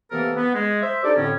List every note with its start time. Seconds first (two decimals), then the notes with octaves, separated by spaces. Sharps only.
0.11 C3 E3 A#3 B3 A4 A#4
0.36 B3
0.54 G#3
0.83 C5 E5
1.04 D4 D#4 G4 A4 D5
1.17 F2 A2 D3 C4 C#4